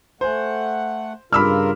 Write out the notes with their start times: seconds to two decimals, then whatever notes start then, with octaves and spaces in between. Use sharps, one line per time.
0.21 A3 C5 F#5 G#5
1.33 G2 C#3 F4 A#4 B5 D6 E6 F6